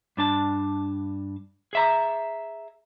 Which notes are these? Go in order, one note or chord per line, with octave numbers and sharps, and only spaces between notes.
G2 D4 A5
G#4 E5 A#5